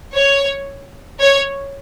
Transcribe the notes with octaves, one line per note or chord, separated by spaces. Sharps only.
C#5
C#5